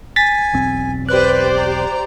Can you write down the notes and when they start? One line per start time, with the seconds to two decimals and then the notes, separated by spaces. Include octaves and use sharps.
0.16 G#5 A6 B6
0.53 E1 B1 C4
1.09 G4 B4 C5 D5 F#6
1.57 A#5